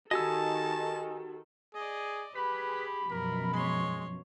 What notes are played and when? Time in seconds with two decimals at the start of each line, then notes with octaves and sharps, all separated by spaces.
0.11 D#3 F#4 G4 A4 D#5 G#5 A5 E6
1.74 G#4 D5 D#5
2.35 G4 G#4 B4 B5
2.73 B5
3.11 F#2 B2 F3 A#4
3.54 G#3 C#5 C6